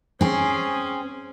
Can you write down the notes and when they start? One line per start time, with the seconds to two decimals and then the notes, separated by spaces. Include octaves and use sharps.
0.21 C4 C#4 G#4